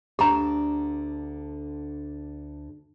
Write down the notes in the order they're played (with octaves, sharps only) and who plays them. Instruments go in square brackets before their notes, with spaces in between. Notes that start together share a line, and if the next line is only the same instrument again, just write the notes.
[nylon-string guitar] D2 D3 D4 [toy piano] G4 A#5